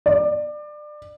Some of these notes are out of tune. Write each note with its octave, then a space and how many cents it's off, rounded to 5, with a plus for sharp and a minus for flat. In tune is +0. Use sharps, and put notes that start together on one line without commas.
D5 +25